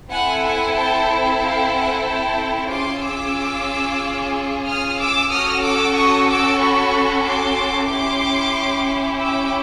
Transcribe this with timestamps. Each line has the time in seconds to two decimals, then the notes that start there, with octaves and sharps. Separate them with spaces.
0.12 C4 E4 A4 F#5 G#5
0.45 F#5 G#5
0.76 G5 A5
1.41 F5 G5
1.74 F#5 G#5
2.07 G5 A5
2.71 C#4 F4 G#4 C6 D6
3.04 D6 E6
4.67 D#6 F6
4.98 D6 E6
5.30 C#4 F#4 A4 D#6 F6
5.63 D6 E6
5.96 C#6 D#6
6.28 D6 E6
6.60 B5 C#6
7.25 C6 D6
7.90 C#4 E4 G4 C6 D6
9.20 D6 E6